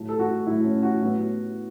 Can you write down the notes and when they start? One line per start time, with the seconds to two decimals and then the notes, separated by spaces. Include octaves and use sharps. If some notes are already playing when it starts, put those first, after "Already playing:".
Already playing: A2 F#3 A3
0.09 A4
0.19 F#4
0.46 A2 F#3 A3 E4
0.64 C#4
0.83 F#4
1.01 A2 F#3 B3